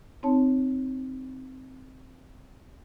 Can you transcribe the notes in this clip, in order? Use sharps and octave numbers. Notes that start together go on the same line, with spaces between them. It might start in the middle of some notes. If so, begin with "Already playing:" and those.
C4 D#4 C#5 A5